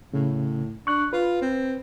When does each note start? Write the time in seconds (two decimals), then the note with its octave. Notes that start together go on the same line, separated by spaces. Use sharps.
0.14 A2 C#3
0.87 D4 C#6 F#6
1.13 F4 B4
1.42 C4